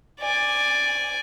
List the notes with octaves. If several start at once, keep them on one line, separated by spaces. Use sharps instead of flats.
D5 G#5